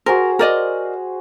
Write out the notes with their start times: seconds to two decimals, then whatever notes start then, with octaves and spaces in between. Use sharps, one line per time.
0.06 F#4 G#4 A#4 C5
0.39 A#4 D5 D#5